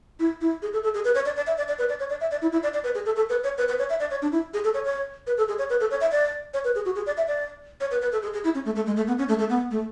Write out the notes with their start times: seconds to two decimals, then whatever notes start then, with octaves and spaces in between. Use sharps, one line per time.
0.20 E4
0.41 E4
0.62 G#4
0.73 A4
0.84 A4
0.94 G#4
1.05 B4
1.15 C#5
1.26 D5
1.36 D5
1.47 E5
1.58 D5
1.68 D5
1.79 B4
1.89 D5
2.00 C#5
2.10 D5
2.21 E5
2.31 D5
2.42 E4
2.52 E4
2.63 D5
2.74 D5
2.84 B4
2.95 G#4
3.06 A4
3.16 A4
3.30 B4
3.44 C#5
3.58 B4
3.69 B4
3.79 C#5
3.90 E5
4.00 D5
4.11 C#5
4.22 D4
4.32 E4
4.54 G#4
4.64 A4
4.74 C#5
4.85 C#5
5.27 B4
5.38 A4
5.48 G#4
5.59 C#5
5.70 B4
5.80 A4
5.91 C#5
6.01 E5
6.12 D5
6.54 C#5
6.64 B4
6.75 G#4
6.85 F#4
6.96 G#4
7.06 D5
7.17 E5
7.28 D5
7.81 C#5
7.91 B4
8.02 B4
8.12 A4
8.22 G#4
8.34 G#4
8.44 E4
8.54 C#4
8.65 A3
8.76 A3
8.86 G#3
8.97 A3
9.07 B3
9.18 C#4
9.29 A3
9.39 A3
9.50 B3
9.71 A3